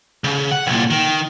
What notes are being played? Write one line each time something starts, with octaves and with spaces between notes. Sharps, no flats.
C#3
F#5
C2 A#2
D#3